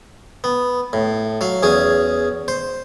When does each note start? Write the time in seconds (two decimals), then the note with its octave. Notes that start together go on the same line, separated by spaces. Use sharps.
0.44 B3
0.93 A2
1.41 F#3 F5
1.63 E2 C#4 G#4
2.48 C5